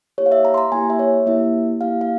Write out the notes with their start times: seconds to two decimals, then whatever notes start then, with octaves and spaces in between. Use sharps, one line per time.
0.18 A#3 E4 G4 C#5
0.26 F5
0.32 E5
0.45 A#5
0.54 C6
0.58 A#5
0.72 A#3 E4 G4 G#5
0.90 E5
0.99 C#5
1.26 A#3 E4 G4 E5
1.81 A#3 E4 G4 F5
2.01 F5